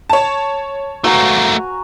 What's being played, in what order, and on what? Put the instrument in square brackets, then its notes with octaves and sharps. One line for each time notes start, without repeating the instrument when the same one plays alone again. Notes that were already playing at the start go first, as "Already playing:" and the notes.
[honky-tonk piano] C#5 A5
[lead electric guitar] A3 A#3 [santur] F#4 G#5 A#5